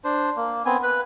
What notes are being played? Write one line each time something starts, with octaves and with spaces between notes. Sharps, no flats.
D4 C5
A#3
B3 C4 G#5
B4